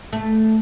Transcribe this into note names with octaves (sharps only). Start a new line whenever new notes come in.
A3